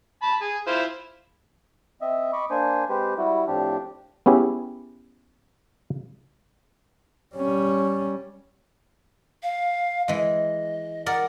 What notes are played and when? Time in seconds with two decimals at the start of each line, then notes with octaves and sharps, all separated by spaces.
0.22 A5 B5
0.41 G#4
0.67 E4 F4 C5
2.01 C4 D#5 E5
2.33 D#5 B5 C#6 D6
2.51 A#3 D4 C5 G#5
2.89 G#3 C4 G4 B4 C5
3.18 G3 E4 F#4
3.47 A2 F3 C4 D4 G4
4.26 B3 C#4 E4 G4 G#4
7.36 G3 C#4
9.43 F5
10.08 E3 G#3 D#5
11.06 A#4 D5 F#5